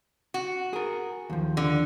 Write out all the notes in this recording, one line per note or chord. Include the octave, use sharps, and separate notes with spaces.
F#4
G#4 A#4
D#2 F3
D3